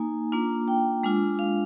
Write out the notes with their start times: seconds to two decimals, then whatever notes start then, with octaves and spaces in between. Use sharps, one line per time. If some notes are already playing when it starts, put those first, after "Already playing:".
Already playing: A#3 D#4 G#5
0.32 A#3 D4 F4
0.68 G5
1.03 G#3 D4 F4
1.39 F5